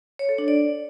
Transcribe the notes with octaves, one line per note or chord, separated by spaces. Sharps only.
C#5
A4
D4
D5